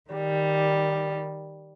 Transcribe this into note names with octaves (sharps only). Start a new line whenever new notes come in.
D#3 G3